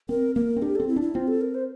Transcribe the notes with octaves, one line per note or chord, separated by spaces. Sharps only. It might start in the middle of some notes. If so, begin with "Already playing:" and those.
C4 A#4
A#3 A#4
C4
D4 G4
C4 A4
E4
D4
E4
C4 F4
A4
A#4
C5